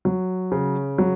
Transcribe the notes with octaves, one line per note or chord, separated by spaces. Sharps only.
F#3
C#3
F#3